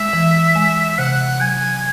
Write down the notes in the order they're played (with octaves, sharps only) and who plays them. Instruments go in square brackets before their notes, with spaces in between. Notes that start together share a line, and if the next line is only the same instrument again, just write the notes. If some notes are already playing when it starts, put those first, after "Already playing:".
Already playing: [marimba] G#3 [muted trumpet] E5
[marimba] E3
G#3
[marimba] C3 [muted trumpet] F#5
[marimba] F#3 [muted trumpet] G#5